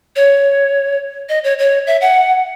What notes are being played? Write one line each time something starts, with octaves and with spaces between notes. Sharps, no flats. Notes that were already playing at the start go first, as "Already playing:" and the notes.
C#5
D#5
C#5
C#5
E5
F#5